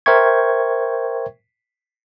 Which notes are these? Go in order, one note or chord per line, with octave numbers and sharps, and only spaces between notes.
A#4 C5 E5 G5 C#6 G#6